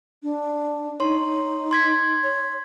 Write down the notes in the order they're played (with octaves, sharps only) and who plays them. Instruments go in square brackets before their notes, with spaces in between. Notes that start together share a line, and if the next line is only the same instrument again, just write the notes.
[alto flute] D4
[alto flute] D#4 [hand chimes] C#5 C6
[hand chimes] C6 G#6 B6
[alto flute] C#5